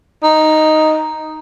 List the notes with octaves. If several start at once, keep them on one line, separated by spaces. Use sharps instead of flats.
D#4